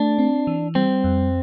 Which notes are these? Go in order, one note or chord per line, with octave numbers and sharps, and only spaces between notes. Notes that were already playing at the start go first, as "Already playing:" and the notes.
Already playing: A3 D4
C4
E3
G3 C4
F2